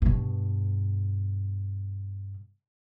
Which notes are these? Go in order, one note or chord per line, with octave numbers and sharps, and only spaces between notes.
G2 B2